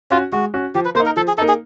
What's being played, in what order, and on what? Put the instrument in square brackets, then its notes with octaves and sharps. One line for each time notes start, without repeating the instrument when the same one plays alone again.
[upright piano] C#4 F#4 [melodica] F4
[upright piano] G#3 [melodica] F#4
[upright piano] C#4 F#4
[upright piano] F3 [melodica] G4
[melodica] B4
[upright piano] A#3 [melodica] C5
[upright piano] D#4
[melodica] A#4
[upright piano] F3 [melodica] A4
[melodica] G#4
[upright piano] A#3 D#4 [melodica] A4
[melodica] G#4